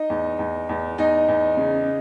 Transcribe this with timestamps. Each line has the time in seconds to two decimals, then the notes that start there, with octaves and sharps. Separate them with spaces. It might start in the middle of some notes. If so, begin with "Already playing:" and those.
Already playing: D#4 D#5
0.10 E2
0.39 E2
0.69 E2
0.98 E2 D#4 D#5
1.28 E2
1.57 C#3